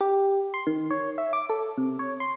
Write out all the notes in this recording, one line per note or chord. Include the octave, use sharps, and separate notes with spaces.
G4
C6
D#3
C#5
E5
D6
A4
C3
C#5
C6